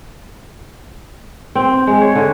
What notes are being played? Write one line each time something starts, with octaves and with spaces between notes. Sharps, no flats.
C4
G#3
C#5
D3